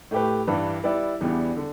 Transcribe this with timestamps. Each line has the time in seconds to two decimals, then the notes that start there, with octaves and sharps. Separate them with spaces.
0.11 A2 A3 G4 B4
0.47 G2 E3 G3 D4 B4
0.84 G3 E4 B4 D5
1.21 E2 E3 G3 B3 D4
1.56 D3